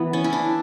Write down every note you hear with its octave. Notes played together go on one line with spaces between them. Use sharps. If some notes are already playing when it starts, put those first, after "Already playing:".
Already playing: E3 B3
C#4
E4
D4